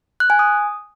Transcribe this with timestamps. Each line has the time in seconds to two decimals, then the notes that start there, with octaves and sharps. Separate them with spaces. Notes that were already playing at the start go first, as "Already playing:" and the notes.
0.20 F#6
0.30 G#5
0.39 D#6